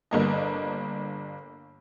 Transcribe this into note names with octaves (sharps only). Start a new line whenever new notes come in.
G1 A#3 D#5